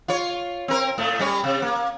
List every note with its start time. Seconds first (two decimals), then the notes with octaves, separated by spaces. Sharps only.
0.08 F4 C#5
0.68 C4 A#4
0.98 A2 A3
1.19 G3 C#4 C#5
1.44 C3
1.62 A#3